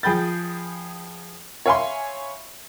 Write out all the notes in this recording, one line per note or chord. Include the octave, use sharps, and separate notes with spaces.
F3 G#4 G5 B5 G6 A6
C#5 E5 F5 G#5 B5 C6